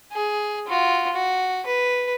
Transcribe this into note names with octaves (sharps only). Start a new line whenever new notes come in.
G#4
F4 F#4
F#4
B4